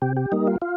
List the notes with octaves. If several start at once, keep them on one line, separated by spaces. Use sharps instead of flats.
C3 G4
G4
G3 A#3 D#4
F4
F4